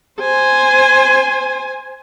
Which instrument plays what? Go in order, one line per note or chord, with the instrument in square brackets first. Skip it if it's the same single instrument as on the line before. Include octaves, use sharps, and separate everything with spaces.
[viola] C5 G#5